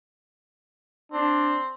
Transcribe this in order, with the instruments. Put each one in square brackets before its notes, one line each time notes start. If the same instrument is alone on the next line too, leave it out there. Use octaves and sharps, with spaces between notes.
[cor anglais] C4 [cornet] D4